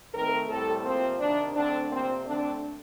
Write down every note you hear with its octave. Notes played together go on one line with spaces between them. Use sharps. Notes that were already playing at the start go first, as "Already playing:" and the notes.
D#3 A3 C4 A#4
A2 G3 C4 A4
C3 F3 A#3 C4
C3 D#3 A#3 D4
D3 A3 C4 D4
C3 F3 A#3 C4
D3 A3 C4 D4